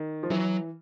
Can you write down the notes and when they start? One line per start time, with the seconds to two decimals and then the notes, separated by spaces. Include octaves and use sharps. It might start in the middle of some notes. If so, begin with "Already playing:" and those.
Already playing: D#3
0.23 F3
0.30 E3 F#3